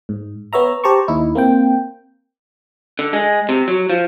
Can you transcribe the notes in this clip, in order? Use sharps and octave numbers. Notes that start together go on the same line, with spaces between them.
G#2
B3 C#5 E5 A#5
G4 C5 A5 A#5 C#6
D#2 D#4 E4
A#3 C4 G5
D3
G#3
C3
F#3
F3